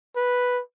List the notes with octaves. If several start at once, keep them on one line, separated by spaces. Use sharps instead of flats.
B4